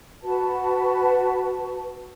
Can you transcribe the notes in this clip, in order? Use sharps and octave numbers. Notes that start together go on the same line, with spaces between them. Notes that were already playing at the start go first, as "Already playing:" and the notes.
F#4 B4 A5